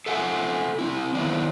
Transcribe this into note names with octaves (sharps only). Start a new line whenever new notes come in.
A4 E5 F#5 G#5
C4 E4
D#3 B3 C4 E4 D5